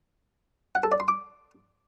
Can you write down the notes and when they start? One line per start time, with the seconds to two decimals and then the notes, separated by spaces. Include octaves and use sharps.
0.75 F#5
0.83 A4
0.92 D5
1.00 C6
1.08 D6